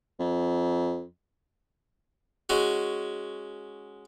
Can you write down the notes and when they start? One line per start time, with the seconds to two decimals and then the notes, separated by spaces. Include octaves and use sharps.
0.20 F2
2.49 G#3 C#4 F#4